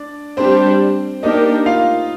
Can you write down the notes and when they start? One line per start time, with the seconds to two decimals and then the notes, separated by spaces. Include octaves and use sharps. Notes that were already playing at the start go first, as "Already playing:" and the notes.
Already playing: D4 D5
0.37 G3 C4 D4 G4 C5
1.23 A#3 D4 D#4 G4 A#4 D#5
1.66 F4 F5